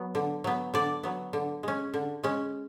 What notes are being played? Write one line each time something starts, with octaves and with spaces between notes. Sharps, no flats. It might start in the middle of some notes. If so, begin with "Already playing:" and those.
Already playing: F#3 B3
D3
F#3 B3
D3 D5
F#3 B3
D3
G#3 C#4
D3
G#3 C#4